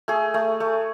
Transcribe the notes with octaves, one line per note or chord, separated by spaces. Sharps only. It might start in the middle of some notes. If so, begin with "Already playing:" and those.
A3 G#4
A3
A3